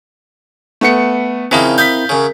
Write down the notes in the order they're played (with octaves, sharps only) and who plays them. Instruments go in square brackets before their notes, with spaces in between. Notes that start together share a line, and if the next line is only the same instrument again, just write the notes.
[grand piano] A3 B3 C#7
[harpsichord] C#3 F3 D#4 [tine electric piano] C4 E4 A#4
[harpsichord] D#5 F5 [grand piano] G6 B6
[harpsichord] F#2 C#3